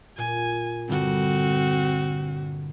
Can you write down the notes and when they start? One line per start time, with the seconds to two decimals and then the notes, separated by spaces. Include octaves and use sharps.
0.18 A#2 G#5
0.89 G2 D3 G3 C4 F#4